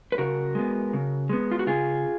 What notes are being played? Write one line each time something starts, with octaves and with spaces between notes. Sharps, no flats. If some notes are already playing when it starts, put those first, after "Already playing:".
B4
C#3 F#4 A#4
G#3 B3
C#3
G#3 B3
F4
F#4
C#3 F4 G#4